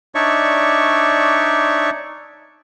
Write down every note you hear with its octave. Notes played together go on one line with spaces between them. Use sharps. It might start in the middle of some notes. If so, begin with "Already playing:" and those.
D4 D#4 C#5 D5 E5 C#6